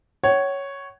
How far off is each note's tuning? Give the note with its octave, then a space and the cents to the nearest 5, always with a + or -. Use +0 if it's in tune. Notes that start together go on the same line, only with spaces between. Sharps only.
C#5 +0 F#5 +35